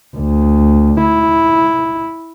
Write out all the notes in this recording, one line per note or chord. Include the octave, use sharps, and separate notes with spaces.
D2
E4